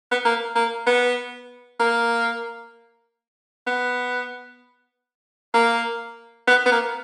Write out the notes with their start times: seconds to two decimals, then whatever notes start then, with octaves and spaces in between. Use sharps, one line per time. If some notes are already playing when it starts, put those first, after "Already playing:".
0.11 B3
0.25 A#3
0.55 A#3
0.86 B3
1.80 A#3
3.67 B3
5.54 A#3
6.47 B3
6.66 B3
6.71 A#3